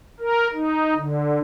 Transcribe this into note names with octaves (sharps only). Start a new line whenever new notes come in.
A#4
D#4
D3